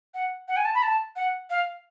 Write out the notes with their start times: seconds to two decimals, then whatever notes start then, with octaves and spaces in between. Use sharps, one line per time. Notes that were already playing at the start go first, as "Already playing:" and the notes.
0.14 F#5
0.48 F#5
0.57 G#5
0.65 A5
0.75 B5
0.83 A5
1.16 F#5
1.50 F5